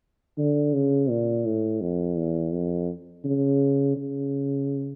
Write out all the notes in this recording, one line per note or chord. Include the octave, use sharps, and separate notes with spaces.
D3
C#3
A#2
A2
F2
E2
F2
C#3
C#3